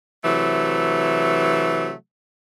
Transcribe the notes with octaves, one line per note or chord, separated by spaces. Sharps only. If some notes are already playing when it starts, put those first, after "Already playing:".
C3 E3 F#3 A3